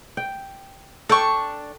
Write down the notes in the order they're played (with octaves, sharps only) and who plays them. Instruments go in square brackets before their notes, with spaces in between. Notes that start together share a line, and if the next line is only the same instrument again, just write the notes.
[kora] G5
[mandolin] D4 C#6 [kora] A4 G5